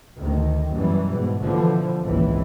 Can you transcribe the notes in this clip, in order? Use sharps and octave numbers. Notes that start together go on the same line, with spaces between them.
D2 D#3
F#2 B2 E3 G3
G#2 B2
B2 D3 E3 F3
G#1 C#2 A#2 E3